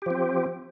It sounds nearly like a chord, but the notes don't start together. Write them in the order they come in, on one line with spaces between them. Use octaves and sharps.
G4 F3 C4